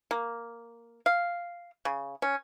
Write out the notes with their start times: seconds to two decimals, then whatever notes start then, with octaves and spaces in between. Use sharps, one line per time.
0.11 A#3
1.06 F5
1.85 C#3
2.22 C#4